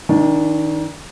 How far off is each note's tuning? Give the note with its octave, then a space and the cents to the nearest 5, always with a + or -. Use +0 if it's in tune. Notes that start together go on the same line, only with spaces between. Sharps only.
D#3 +20 D4 -10